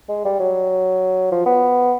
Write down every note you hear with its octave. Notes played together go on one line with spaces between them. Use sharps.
G#3
G3
F#3
F3
B3